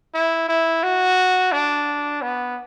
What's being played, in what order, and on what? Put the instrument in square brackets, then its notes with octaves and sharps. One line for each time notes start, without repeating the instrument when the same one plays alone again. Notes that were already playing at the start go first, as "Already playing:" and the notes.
[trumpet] E4
E4
F#4
D4
B3